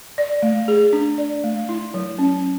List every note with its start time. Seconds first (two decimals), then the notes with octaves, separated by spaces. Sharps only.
0.18 D5
0.43 A3
0.68 G#4
0.93 D4
1.18 D5
1.44 A3
1.69 E4
1.94 F#3
2.19 C#4